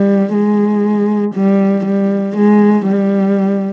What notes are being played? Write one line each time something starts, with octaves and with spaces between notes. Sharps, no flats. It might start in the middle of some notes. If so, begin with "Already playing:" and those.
Already playing: G3
G#3
G3
G3
G#3
G3